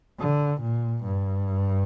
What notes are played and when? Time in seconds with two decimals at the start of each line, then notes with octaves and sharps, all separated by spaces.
0.20 D3
0.61 A#2
1.04 G2